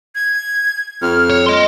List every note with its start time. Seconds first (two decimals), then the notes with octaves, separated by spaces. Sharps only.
0.15 G#6
1.02 F2 F6
1.30 C#5
1.46 D#5 C6